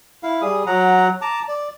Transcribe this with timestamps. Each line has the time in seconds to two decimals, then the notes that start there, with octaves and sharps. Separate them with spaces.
0.23 E4 F5
0.42 G3 G#4 D#6
0.66 F#3 F#5 A#5
1.21 A5 A#5 D6
1.48 D5